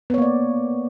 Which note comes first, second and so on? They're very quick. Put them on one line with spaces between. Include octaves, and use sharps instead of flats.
B3 C#5 A#3 D5